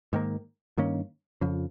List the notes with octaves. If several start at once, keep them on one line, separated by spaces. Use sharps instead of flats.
G#2 D#3 A#3
G2 D#3 A#3 C#4
F2 C#3 F3